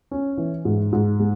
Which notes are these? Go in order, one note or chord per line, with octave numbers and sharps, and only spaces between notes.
C#4
E3
G#2
G#2
G#3